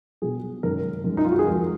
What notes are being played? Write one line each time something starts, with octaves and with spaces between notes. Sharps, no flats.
B2 F#3 G#4
F#2 D#3 G#3 A#4
F#2 D#3 G#3
D#4
F4
F#4
G#4
F2 F3 G#3 A#4